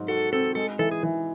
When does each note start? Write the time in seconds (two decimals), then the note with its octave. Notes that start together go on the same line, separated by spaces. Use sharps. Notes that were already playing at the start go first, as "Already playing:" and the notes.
Already playing: G#2 F#3
0.08 F#4 A4
0.33 C4 A4
0.55 G#3 A4
0.79 E3 A4
0.91 G#4
1.03 E3